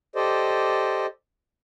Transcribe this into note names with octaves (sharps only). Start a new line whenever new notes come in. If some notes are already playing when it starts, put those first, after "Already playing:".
G4 A4 C5 D5 D#5